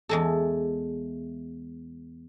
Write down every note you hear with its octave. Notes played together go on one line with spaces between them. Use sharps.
E2 G#3 A4